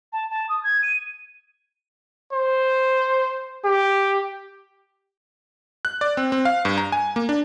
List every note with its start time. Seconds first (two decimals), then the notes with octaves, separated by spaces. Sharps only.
0.12 A5
0.29 A5
0.49 D#6
0.63 G#6
0.83 D#7
2.33 C5
3.65 G4
5.85 F#6
6.01 D5
6.17 C4
6.32 C4
6.45 F5
6.65 G2
6.78 A#5
6.92 G#5
7.16 A#3
7.29 D4